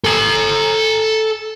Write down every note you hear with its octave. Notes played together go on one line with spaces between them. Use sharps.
A4 G#5